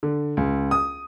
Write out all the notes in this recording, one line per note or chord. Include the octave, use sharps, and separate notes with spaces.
D3
C#2
D#6